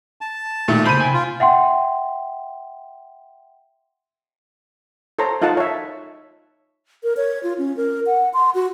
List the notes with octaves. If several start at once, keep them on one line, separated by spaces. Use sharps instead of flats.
A5
A#2 D#3 A3
C#3 A#3 C5 B5 D#7
C3 G5 G#5
F4
E5 F#5 G5 C6
A4 C5 C#5 A#5
D#4 F4 A4 F#5 A5
C#5 E5
A#4
C#5
F4
C#4
A#4
F#5
C6
F#4